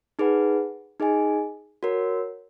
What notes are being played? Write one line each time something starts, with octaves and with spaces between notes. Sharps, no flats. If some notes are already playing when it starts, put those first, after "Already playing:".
D#4 G#4 B4 F#5
D#4 G#4 D#5 G#5
F#4 A#4 C#5